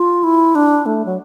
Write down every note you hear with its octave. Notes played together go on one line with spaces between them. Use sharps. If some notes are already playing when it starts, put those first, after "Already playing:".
Already playing: F4
E4
D4
A3
F#3